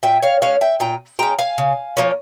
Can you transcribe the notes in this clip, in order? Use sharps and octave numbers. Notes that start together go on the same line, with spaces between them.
A#2 E5 G5
C#5 F5
G#3 C#4 C#5 F5
E5 G5
A#2 G5 A#5
G#3 C#4 G5 A#5
F5 G#5
C#3
F3 A#3 C#4